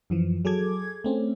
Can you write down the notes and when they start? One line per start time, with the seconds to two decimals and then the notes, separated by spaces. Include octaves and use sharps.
0.10 F#2 E3 F3
0.45 F#3 G#4 A4 D6 G#6
1.04 A3 C4 C#4